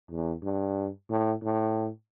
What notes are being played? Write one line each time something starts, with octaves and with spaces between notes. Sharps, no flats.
E2
G2
A2
A2